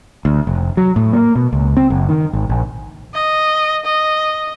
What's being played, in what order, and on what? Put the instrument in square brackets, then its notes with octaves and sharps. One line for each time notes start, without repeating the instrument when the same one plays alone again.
[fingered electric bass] D2
F1
F#3
A2
A#3
B2
C#2
C4
F#1
D#3
G#1
A#1
[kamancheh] D#5
D#5